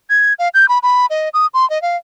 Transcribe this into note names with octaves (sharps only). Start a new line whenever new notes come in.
G#6
F5
G6
B5
B5
D#5
D#6
C6
D#5
F5